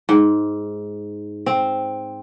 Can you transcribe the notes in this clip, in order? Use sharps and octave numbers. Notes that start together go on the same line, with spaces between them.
G#2
C4